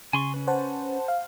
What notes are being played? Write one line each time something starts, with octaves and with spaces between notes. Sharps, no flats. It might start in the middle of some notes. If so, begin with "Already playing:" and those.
C#3 G#5 C6 C#6
C#4 B4
C5 F#5 A5
F5